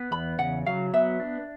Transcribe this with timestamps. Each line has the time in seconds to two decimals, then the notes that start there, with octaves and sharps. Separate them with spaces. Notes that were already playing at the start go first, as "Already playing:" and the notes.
Already playing: B3
0.11 E2 B5
0.39 C#3 F#5
0.66 F#3 F5
0.94 B3 E5
1.20 D4